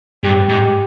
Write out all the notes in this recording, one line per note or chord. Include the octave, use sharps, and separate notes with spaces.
G2 G4
G#2